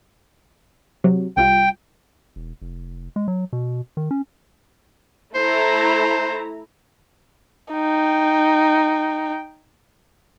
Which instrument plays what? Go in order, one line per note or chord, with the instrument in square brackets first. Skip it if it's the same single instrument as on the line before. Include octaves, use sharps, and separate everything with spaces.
[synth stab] C3 F#3
[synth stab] C2 G3 F4 [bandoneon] G5
[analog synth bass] E1
F1
G#3
F#3
B2
D#3
C#4
[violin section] A3 E4 A#5 [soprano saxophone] C5
[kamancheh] D#4 G5